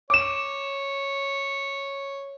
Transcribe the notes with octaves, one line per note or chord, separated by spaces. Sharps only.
C#5 D6 E7